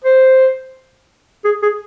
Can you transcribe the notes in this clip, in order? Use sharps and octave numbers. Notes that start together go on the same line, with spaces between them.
C5
G#4
G#4